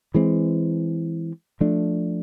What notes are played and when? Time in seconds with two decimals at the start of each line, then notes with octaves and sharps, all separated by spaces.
0.14 E3 G#3 C4
1.60 F3 A3 D4